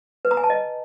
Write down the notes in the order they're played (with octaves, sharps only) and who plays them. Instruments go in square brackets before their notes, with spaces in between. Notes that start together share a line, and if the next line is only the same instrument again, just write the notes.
[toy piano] B4
A#5
G#5
A5
D#5